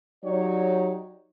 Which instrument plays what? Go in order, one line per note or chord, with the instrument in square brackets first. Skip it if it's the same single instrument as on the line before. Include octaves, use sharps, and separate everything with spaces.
[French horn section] F#3 D#4 G4 C#5 D5